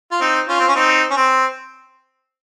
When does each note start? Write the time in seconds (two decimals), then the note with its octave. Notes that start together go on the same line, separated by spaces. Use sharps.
0.12 F4
0.21 C4 D#4
0.48 C#4 F4
0.60 C4
0.68 C#4
0.75 C4 D#4
1.11 C#4
1.17 C4